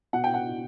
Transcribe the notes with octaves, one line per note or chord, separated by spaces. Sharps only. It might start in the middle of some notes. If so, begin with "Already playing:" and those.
B2 F#5
G5
F#5